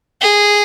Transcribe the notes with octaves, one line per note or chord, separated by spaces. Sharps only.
G#4